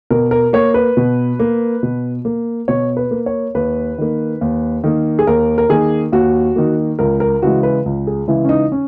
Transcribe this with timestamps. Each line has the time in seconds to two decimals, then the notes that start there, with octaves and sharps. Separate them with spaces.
0.10 B2 A#4
0.31 A#4
0.53 A#3 C#5
0.74 B4
0.97 B2
1.40 A#3
1.83 B2
2.25 A#3
2.68 B2 C#5
2.97 B4
3.11 A#3
3.26 C#5
3.55 D#2 B4
3.98 D#3 A#3
4.41 D#2
4.84 D#3 A#3
5.19 G#4
5.27 D#2 A#4
5.58 A#4
5.69 D#3 A#3 G#4
6.12 D#2 F#4
6.56 D#3 A#3
6.99 C#2 A#4
7.20 A#4
7.42 C#3 E3 G#3 F#4
7.63 B4
7.86 C#2
8.07 G#4
8.28 C#3 E3 G#3 E4
8.44 C#4
8.49 D#4
8.72 C#4